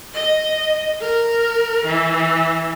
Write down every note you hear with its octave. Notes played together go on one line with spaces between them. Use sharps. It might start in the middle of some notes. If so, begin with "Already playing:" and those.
D#5
A#4
E3